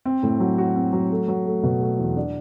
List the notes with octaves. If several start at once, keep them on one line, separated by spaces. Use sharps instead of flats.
C4
A2
F#3
F#4
C4
F#3
A3
F#3
A3
B2
A3
E2
D4